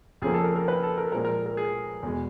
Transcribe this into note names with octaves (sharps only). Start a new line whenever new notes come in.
F2 C#3 F3 A#3 G#4
A4
A#4
A#4
B4
A4
A#4
A#2 F3 G#3 A#4
A#4
A#4
G#4
E2 B2 G#3